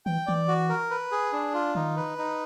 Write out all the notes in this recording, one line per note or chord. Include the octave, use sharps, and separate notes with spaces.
E3 G5
E3 D5
F#4
A#4
B4
G#4
D4
F4
D#3 D#4
B4
D#4